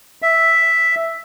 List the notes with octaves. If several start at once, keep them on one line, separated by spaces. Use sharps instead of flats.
E5